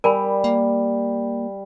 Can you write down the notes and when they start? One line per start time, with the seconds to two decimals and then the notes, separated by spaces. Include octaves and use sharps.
0.04 G3 A#4 G#5 B5
0.44 A#3